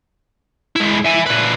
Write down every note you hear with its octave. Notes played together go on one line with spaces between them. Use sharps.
G#3 E4
E5 G#5
A#2 B4